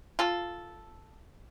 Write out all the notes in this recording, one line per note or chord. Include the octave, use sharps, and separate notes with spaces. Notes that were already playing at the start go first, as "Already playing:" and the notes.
F4 A4